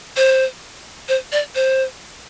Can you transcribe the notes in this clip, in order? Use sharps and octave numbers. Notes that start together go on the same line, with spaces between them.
C5
C5
D5
C5